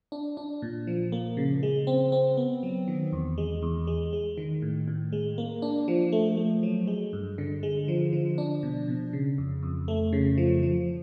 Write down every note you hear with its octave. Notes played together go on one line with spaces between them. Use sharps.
D4
D4
A#2
F3
A#3
C#3
G#3
C4
C4
B3
F#3
D#3
E2
G#3
E2
G#3
G#3
D#3
A2
A2
G#3
A#3
D4
F3
A3
A3
F#3
G#3
G2
D3
G#3
F3
F3
D4
B2
B2
C#3
F2
F2
A3
C#3
F3
F3